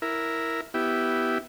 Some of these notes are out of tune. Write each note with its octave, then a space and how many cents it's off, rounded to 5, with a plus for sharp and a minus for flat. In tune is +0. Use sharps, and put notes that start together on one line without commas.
E4 +0 A#4 +0
B3 +0 E4 -5 G4 -10